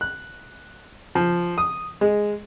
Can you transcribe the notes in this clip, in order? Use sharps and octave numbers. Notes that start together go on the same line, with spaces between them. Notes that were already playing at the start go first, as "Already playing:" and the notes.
F#6
F3
D#6
G#3